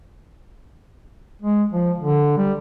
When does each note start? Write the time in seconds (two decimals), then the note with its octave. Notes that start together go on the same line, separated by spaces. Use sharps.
1.41 G#3
1.73 F3
1.98 D3
2.38 G3